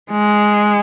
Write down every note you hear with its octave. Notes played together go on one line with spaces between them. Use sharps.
G#3